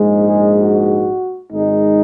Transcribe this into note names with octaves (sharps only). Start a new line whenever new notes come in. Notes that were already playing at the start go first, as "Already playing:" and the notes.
Already playing: A#1 G#2 G#3
G#4
F#4
G#1 G#2 G#3 D#4